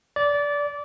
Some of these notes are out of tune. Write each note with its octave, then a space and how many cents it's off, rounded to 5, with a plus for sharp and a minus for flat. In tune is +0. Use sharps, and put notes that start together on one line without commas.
D5 -20